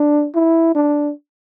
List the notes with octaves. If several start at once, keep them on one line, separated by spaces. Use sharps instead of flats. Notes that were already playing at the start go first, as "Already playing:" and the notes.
Already playing: D4
E4
D4